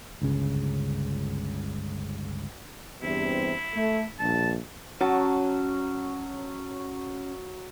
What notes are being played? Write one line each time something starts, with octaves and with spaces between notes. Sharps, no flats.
G1 C#2 C#3
E2 G2 C3 E4
A3
A#1 G2 A5
F#3 C#4 A5